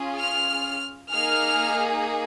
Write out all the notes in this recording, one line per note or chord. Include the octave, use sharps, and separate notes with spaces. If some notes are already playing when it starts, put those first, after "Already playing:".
Already playing: C#4 F4 G#4
F6
A#3 D#4 G#4 F6